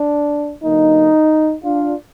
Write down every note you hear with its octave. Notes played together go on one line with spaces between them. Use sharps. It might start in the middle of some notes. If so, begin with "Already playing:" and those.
Already playing: D4
D3 F#3 A#3 D#4
D4 F4